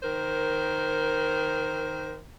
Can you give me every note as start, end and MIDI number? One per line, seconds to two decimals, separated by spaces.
0.03 2.18 51
0.03 2.18 70
0.03 2.18 72